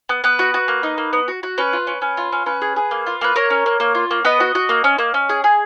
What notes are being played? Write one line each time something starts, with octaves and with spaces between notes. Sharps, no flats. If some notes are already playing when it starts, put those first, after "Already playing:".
B3
B3 B4
F#4
F#4
A#3
D#4
A#3
B3
F#4
F#4
C#4 B4
F4
C#4
C#4
F4
C#4
C#4 B4
G#4
G#4
A#3
F4
A#3 B4
A#3 A#4 C#5
C#4
A#3
A#3
F4
A#3
B3 B4 D#5
F#4
F#4
A#3
C#4
A#3
C#4
G#4
G#4